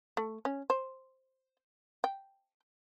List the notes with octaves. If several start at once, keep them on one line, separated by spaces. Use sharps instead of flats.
A3
C#4
C5
G5